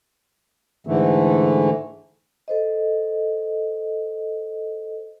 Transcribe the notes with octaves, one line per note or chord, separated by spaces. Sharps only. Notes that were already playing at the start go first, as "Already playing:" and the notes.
G#2 D3 E3 A3
A4 C5 D#5